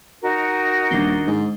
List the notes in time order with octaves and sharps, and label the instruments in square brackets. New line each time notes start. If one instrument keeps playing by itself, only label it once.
[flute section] D#4 F#4 A#4
[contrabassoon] D#1 [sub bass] D#3 [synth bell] D4 C7 G7
[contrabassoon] G#2